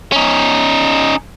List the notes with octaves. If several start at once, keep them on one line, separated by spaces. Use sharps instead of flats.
C#4 D#4